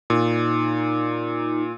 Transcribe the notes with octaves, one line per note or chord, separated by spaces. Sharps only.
A#2 D#4